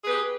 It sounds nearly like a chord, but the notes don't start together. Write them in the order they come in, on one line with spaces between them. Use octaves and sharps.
G#4 B4 G4